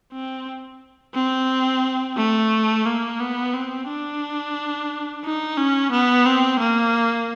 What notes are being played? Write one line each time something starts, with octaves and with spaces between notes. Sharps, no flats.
C4
C4
A3
A#3
B3
C4
D4
D#4
C#4
B3
C4
A#3